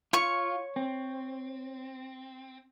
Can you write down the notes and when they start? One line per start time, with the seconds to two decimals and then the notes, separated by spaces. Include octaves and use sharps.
0.13 F4 C#5 C#6
0.76 C4